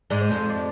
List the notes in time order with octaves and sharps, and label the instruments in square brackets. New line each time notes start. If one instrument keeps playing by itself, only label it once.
[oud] G#2 G#3 [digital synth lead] D5
[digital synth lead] C5
[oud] F2 F3
[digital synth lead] D5